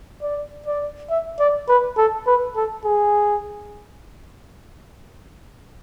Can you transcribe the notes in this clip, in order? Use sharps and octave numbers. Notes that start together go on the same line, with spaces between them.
D5
D5
E5
D5
B4
A4
B4
A4
G#4